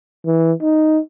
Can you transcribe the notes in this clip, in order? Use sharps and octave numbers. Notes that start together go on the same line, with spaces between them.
E3
D#4